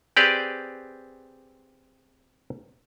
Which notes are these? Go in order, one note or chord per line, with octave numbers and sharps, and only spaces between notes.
C4 G4 G#4 B4 D5